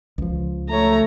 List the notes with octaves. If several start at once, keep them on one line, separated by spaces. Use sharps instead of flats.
C#2 F3
A3 C#5 A#5